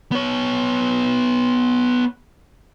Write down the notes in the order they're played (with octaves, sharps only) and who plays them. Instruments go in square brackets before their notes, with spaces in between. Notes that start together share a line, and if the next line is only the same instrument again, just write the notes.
[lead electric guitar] B3 C#5